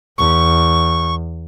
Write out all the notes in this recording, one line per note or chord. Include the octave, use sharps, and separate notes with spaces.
E2 C#6